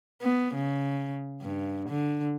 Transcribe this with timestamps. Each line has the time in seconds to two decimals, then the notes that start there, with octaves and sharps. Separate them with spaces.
0.22 B3
0.55 C#3
1.42 G2
1.89 D3